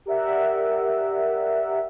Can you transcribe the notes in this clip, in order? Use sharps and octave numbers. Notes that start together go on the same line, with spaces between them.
G4 A#4 D5 E5 F#5